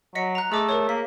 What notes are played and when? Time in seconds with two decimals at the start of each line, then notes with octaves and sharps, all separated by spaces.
0.15 F#3 D#5 B6 C#7
0.35 A#5 F#6
0.52 A3 G#4 D#5 D6
0.69 A#4 C#5
0.89 A#3 B6